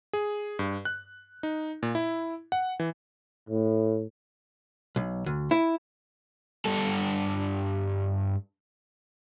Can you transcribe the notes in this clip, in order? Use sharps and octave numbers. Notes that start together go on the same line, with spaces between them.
G#4
G2
F#6
D#4
A#2
E4
F#5
E3
A2
B1
D2
E4
G2 A4